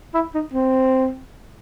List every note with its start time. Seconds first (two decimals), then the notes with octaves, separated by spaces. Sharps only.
0.14 E4
0.34 D#4
0.54 C4